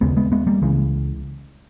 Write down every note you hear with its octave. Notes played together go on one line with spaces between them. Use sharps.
D#2 C#3 G#3 B3
G#3 B3
G#3 B3
G3 A#3
C#2 C#3 E3 G#3